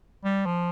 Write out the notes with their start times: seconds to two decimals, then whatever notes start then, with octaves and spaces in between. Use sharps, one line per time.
0.24 G3
0.46 F3